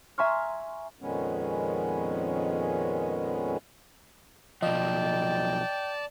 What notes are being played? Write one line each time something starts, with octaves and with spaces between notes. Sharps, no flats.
E5 G#5 A#5 C6 C#6 F6
F2 A#2 D#3 G#3 B3 C#4
B1 F3 D5 D#5 G5 A5